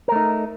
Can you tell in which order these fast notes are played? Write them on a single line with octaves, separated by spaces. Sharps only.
A#4 A3 D#4